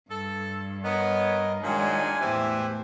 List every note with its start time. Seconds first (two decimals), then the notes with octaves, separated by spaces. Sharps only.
0.10 G2 A4
0.84 B3 A#4 C#5 D#5
1.63 A#2 D#3 F#3 G#3 D4 G#5
2.21 E2 A2 E3 G4 C5 E5